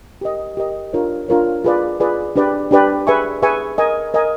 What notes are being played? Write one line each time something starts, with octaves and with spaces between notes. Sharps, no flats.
G4 A#4 D#5
G4 A#4 D#5
D4 F4 A#4 C#5
D4 F4 A#4 C#5
F4 G#4 B4 D5
F4 G#4 B4 D5
D4 G4 B4 D5 G5
D4 G4 B4 D5 G5
G#4 B4 E5 G#5 C#6
G#4 B4 E5 G#5 C#6
A#4 D#5 G#5
A#4 D#5 G#5